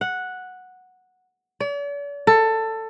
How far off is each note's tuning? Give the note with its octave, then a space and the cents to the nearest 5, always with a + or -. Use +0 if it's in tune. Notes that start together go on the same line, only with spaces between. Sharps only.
F#5 -5
D5 -45
A4 +15